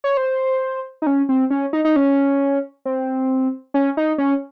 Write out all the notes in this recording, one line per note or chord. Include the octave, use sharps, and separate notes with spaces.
C#5
C5
D#4
C#4
C4
C#4
D#4
D#4
C#4
C4
C#4
D#4
C#4